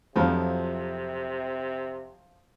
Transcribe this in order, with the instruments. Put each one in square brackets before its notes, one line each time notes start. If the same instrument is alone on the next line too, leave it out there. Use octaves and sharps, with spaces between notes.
[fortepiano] F2 F3 F#3 [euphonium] C3